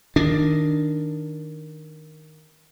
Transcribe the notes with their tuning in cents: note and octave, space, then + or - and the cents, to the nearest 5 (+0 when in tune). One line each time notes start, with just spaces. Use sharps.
D#3 +0 D4 +0